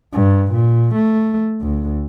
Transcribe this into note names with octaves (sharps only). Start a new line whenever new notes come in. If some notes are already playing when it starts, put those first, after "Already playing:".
G2
A#2
A3
D2